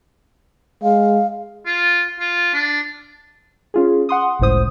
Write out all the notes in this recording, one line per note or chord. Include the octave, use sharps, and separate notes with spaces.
G#3 F5
F4
F4
D4
C#4 F4 G#4
F#5 C6 D#6
G1 C#2 A2 C5 D#6